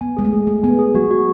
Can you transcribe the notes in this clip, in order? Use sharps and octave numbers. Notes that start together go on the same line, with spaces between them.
B3 G#5
G#3 G#4
A3
G#4
A3 G#4
B3 G#5
G#4
F#3 F#4
F#4